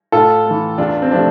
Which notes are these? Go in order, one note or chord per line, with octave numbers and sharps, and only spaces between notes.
A2 F4 A4
E3 A3
E2 D4 F4
C4
C3 F3 A3 D4